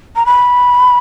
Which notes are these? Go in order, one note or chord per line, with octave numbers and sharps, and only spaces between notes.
A#5
B5